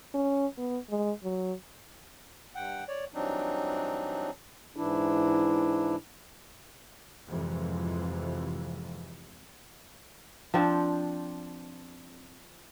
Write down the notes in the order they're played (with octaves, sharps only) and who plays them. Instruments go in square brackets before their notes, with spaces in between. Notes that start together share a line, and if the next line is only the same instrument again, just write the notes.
[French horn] C#4
B3
G#3
F#3
[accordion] G2 F#5 G5
C#5 D5
G2 E3 F#3 C4 D4 D#4
[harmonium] G#2 E3 D4 E4
[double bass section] F2 G#2 C3 E3 F3
[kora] F3 C4 D4